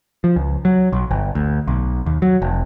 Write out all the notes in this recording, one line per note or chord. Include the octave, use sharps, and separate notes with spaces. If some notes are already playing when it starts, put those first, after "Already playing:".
F3
C#2
F#3
B1
G1
D2
B1
D#2
F#3
F1